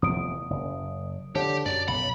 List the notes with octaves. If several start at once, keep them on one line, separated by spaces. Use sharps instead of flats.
F1 E2 F3 D#6 D7
F#1
D3 G4 C#5 A5
F#2 D5
B1 F#2 B5